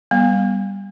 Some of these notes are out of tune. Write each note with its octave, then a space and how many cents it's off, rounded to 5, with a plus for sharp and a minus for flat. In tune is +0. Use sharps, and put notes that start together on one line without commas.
G3 +5 B3 -20